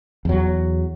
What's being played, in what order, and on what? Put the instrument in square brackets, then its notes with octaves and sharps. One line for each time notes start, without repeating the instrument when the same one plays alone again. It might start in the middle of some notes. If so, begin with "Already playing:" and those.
[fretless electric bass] E2 F#3